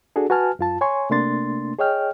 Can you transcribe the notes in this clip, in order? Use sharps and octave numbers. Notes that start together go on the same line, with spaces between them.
D4 F#4 G#4 A4
F#4 B4 G#5 A5 F6
F#2 F4 A5
C#5 G#5 C6 C#6
C3 A3 A#3 D4 C6 A6
G#4 C#5 D#5 G5 F6